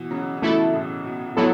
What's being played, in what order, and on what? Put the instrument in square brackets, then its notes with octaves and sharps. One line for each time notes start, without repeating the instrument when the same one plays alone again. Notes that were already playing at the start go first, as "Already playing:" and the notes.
Already playing: [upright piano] B2 E3
C#3 F#3
C#3
[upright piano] B2 E3 [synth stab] A3 E4 A4
[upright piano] A2 C#3
B2
B2
[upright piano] A2 [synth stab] F#3 B3 E4 A4